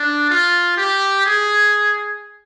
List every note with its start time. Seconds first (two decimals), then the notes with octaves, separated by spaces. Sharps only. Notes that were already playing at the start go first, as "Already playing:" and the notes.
Already playing: D4
0.30 F4
0.77 G4
1.26 G#4